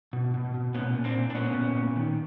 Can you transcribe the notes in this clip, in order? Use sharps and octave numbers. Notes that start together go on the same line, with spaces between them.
B2
B2
B2
A#2 B3 C#4
A#2
C4 D4
A#2
D4
A#2 B3 C#4
A#2
A#2
D#3